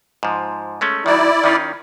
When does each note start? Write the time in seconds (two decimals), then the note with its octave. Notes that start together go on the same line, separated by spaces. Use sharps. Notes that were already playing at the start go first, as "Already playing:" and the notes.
0.23 G#2 F3
0.81 G#3 A3 C#4
1.06 D#3 F#3 E4 D5
1.44 D#3 C#4 F4